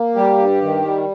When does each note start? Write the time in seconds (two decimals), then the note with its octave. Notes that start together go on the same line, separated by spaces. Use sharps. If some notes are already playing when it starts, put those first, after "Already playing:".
Already playing: A#3
0.15 G3 G4
0.38 G2
0.61 D#3
0.84 G3